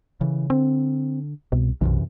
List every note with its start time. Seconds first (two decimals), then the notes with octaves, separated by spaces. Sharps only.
0.21 C#3 E3
0.50 D3 C4
1.52 C2 B2
1.81 B1 F#2 C3 E3